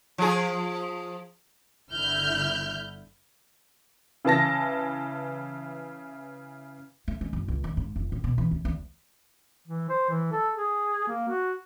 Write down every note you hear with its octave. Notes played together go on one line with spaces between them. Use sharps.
F3 G#4
G1 D3 E4 F6 G6
C#3 E3 A5 A#6
A3
G#3
F#1
C#2
D#2
G#2
F1
A2
B2
E3
D2
D2
E3
C5
E3
A4
G#4
A#3
F#4